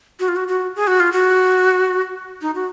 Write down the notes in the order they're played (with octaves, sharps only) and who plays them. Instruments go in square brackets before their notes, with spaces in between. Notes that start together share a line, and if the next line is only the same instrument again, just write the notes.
[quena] F#4
F4
F#4
F#4
G#4
F#4
F4
F#4
D#4
F#4